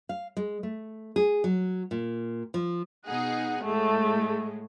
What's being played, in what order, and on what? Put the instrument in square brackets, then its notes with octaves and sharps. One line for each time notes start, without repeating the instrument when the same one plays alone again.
[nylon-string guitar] F5
G#3
A3
G#4
F#3
A#2
F3
[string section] B2 D#4 G#4 [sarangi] F#5
[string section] A2 G#3 [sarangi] A3